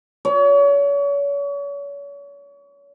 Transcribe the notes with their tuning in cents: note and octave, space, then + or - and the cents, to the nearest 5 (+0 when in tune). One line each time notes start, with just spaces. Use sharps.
C#5 +35